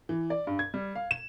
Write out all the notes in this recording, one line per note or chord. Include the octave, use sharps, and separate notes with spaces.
E3
D5
G2
G#6
G3
F5
E7